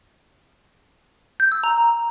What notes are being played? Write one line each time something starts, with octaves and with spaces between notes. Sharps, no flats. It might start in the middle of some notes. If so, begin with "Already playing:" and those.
G6
E6
A#5